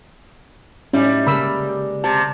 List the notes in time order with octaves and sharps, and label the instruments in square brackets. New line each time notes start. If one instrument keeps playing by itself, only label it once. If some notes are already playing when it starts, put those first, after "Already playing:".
[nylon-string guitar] A2 D#4 E4 [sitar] G3 [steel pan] C#4
[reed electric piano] C#3 [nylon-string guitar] G#3 A#3 [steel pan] B5 E6
[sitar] C3 [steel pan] A5